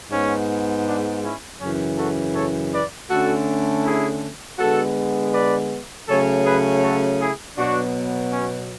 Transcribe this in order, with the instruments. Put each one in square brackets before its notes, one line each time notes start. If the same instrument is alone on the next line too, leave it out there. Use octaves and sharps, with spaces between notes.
[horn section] G#2 G#3 B3 C#4
D4
C#4 E4
F#2 C#3 E3 C#4
F#4 A4
A4 C#5
B4 D5
D3 A3 C#4 F#4 A4
E4 G#4
D3 G#3 B3 F#4 A4
B4 D5
C#3 F#3 A3 C#4 A4 C#5
G#4 B4
F#4 A4
E4 G#4
B2 F#3 B3 D4 F#4
C#4